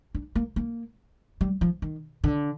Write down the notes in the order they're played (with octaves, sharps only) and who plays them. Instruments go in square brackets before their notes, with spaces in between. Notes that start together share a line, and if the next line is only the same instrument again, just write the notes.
[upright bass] D4
A#3
A#3
G3
F3
D#3
D3